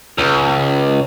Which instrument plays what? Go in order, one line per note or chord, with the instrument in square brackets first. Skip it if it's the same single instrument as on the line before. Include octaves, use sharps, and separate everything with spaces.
[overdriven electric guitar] C#2